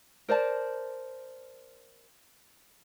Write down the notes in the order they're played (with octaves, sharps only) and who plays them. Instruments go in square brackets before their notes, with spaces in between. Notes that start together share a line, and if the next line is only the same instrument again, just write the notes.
[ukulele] A#4 C5 D5 A5